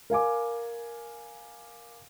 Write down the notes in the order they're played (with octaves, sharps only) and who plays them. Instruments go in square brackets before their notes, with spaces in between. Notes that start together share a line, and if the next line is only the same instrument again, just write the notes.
[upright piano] A#4 F5 G#5 D6